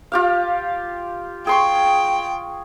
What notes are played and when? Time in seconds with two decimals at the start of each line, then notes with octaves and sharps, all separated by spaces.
0.12 F4 G4 F5
1.47 G#4 G5 C6 C#6